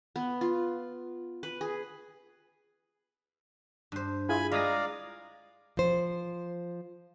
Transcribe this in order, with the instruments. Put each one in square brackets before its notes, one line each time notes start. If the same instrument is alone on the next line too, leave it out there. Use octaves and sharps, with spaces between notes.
[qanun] B3
F4
B4
G#4
[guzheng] G2 C5
[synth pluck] E4 F4 G#4 [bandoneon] G#5 B5
[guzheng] G#3 [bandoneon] D5 F5 [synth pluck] A#5 D#6 A#6
[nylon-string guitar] F3 C5